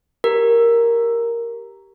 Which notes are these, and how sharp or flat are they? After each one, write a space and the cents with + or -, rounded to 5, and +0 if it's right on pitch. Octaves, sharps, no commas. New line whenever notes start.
G4 +0 A#4 +0